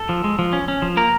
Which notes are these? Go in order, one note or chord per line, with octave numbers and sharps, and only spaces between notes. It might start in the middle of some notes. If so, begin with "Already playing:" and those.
Already playing: A4
F3
G#3
F3
C#4
C#4
F3
A#3 A#4